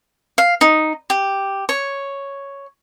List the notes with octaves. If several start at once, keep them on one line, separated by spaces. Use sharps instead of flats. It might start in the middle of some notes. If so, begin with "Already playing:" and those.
F5
D#4
G4
C#5